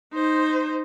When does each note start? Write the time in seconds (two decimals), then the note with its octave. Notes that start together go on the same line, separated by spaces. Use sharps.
0.13 D#4 C5